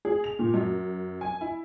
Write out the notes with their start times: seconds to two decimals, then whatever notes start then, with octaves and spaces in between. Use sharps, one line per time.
0.05 G#4
0.24 F7
0.39 A#2
0.54 F#2
1.21 G#5
1.41 E4